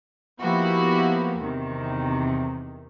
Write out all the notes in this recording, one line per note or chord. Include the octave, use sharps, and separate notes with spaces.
F3 A#3 B3 E4 F#4 G4
E2 C3 D#3